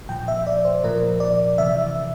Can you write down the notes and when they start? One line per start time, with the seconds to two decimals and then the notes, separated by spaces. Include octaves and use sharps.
0.09 A#2 F3 G5
0.28 E5
0.47 D5
0.65 C5
0.83 A#2 F3 A#4
1.20 D5
1.58 C3 E3 E5